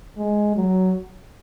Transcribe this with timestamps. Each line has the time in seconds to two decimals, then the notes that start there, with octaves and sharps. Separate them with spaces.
0.17 G#3
0.56 F#3